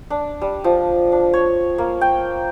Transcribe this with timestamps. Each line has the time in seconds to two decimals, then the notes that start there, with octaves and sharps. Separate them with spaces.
0.10 D4
0.41 G3
0.64 F3
1.12 D4
1.33 C#5
1.78 A#3
2.01 G5